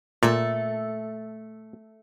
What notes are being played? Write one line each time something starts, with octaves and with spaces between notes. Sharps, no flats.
A#2 A3 A4